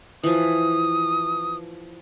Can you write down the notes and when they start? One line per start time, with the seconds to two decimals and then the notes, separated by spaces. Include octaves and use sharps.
0.24 E3 F3 D#6